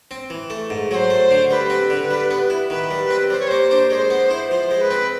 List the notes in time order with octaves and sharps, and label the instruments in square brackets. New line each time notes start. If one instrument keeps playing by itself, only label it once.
[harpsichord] C4
E3
A3
G#2
[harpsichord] F#3 [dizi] C5 C#5
[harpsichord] A3
D3
[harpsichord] G3 [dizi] B4
[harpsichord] C4
D3
G3
B3
E4
[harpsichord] D#3 [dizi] B4
[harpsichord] G3
C4
[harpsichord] G3 [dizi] C5
[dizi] C#5
[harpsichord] A#3 [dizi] C5
[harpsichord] D4
[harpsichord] G#3 [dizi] C#5
[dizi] C5
[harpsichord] B3
E4
[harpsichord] F3 [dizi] C5
[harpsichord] G#3
[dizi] B4
[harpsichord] C4